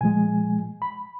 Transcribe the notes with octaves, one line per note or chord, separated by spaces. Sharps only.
A#2 F3 G#3 G#5
B5